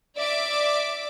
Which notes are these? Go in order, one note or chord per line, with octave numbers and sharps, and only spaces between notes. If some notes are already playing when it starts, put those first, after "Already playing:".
D5 E5 D6